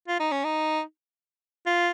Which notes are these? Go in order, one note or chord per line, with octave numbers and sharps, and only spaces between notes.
F4
D#4
C#4
D#4
F4